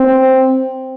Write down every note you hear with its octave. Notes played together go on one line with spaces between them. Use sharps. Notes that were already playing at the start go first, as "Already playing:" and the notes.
Already playing: C4